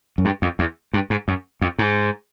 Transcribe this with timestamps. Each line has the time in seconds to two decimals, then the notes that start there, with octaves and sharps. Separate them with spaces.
0.18 F#2
0.25 G2
0.42 F2
0.59 E2
0.94 G2
1.10 G#2
1.28 F#2
1.61 F2
1.79 G#2